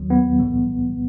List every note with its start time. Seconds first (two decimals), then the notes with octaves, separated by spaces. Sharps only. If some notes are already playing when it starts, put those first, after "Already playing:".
Already playing: D#2 D#3 F#3
0.10 B3
0.39 B1 A2 E3 G3